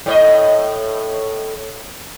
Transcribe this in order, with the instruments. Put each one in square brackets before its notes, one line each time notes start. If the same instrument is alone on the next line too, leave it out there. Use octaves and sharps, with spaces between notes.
[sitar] A2 C#5 D#5